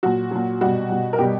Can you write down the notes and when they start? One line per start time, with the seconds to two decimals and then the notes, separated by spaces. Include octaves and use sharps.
0.03 A#2 F#3 F#4
0.31 A#2 F#3
0.61 B2 G3 F#4
0.90 B2 G3
1.13 A#4
1.18 B2 G3 G4